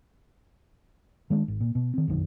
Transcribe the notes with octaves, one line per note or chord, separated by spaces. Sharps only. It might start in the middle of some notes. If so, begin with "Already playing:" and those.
D#3 G#3 D4
G#1
A#2
B2
D#3 C4
F1 B1 F#2 D#3